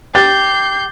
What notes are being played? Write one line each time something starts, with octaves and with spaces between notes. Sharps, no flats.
G4 G6 A6 C7